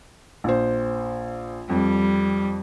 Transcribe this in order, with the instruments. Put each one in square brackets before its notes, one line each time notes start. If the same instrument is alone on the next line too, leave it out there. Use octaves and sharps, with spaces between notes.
[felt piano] A#1 C5
[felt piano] F2 [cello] G3